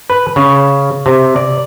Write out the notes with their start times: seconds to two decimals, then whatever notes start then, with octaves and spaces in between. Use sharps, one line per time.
0.10 B4
0.36 C#3
1.06 C3
1.36 D5